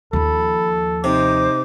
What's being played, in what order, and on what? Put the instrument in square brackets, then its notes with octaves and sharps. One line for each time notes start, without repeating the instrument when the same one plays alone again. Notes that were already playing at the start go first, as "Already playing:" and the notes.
[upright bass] D#2 F3 [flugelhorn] A4 [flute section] B5
[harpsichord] C3 [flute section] D#4 C5 D6